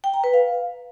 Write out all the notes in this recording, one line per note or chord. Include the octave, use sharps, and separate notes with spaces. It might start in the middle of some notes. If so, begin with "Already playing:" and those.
G5
A#5
B4
F5